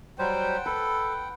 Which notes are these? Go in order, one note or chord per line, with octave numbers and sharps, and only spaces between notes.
F#3 G3 C5 F#5 G5
A4 B4